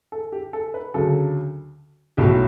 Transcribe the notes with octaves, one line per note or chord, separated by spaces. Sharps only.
A4
G4
A4
B4
D2 C#3 F#3 A4
B1 A2 F#3 G4